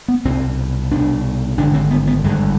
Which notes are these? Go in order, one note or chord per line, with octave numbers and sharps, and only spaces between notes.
B3
C2 B2 C4
C2 B2 D4
G#1 G2 D3 D4
C4
B3
B3
G#1 G2 D3 G#3